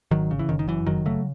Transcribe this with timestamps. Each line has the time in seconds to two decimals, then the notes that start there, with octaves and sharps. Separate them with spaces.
0.11 G#1 D#3 F#3
0.31 C#3
0.39 E3
0.49 F#1 D#3
0.59 D#3
0.68 F#2 E3
0.86 F#1 D#3 F#3
1.06 C#3 F#3 A3